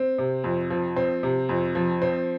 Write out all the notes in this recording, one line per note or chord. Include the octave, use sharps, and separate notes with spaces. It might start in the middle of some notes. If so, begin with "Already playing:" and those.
Already playing: C4
C3
F2
F3
C4
C3
F2
F3
C4